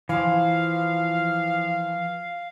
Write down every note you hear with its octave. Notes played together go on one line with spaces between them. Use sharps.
E3 F3 F5